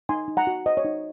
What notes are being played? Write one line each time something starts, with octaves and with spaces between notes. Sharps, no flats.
D#4 G#5 C6
D#4
F#5 A#5
F#4
C5 D#5
C#5
D#4